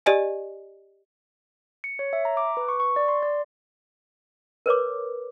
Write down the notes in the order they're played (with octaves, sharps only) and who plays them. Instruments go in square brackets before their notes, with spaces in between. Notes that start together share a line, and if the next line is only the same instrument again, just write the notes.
[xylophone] G4 D5 D#5 G#5
[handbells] C#7
C#5
E5
A#5
D6
B4
C#6
C#6
D5
C6
D5
[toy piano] A#4 B4 C#5 D6